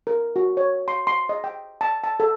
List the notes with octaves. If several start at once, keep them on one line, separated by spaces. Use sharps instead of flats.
A#4
F#4
C#5
C6
C6
D#5
G5
A5
A5
A4